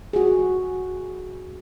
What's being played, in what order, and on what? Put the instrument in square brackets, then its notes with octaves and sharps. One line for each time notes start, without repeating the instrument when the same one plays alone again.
[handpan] F#4 G#4